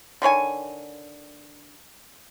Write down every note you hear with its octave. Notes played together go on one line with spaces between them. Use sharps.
D3 D#3 C#5 G#5